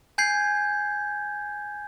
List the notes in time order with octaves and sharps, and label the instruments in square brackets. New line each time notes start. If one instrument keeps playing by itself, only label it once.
[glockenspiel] G#5 G6 G#6 C7